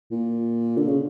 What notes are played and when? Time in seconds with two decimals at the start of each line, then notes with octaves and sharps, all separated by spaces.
0.11 A#2
0.78 D3
0.88 C#3